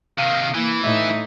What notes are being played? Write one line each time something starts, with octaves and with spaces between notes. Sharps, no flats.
C3 D#3 F5
E3 A#3 E4
A2 D#4 E5